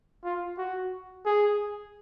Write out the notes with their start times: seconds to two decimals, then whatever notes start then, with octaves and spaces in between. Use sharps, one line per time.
0.24 F4
0.58 F#4
1.26 G#4